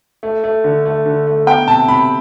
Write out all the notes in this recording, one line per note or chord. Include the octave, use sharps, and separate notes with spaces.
A3
A3
D3
A3
D3
A3
B3 G5
C3 A5
C3 B5